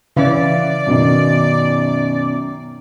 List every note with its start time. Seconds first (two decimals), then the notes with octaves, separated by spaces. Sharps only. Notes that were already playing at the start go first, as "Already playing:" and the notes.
0.17 C#3 E3 C#4 B4 D5 E5 F5
0.86 F#2 B2 D#3